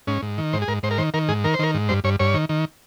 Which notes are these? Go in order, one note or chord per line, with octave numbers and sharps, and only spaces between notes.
G#2 C#4
G#2
D#3
G#2 C5
G#4
G#2 A#4
G#2 C5
A#4
D#3 C5
D#3 A#4
G#2 G#4
D#3 A#4
C5
D#3 A#4
G#2
G2 C5
G2 C#5
G2 C#5
D#3
D#3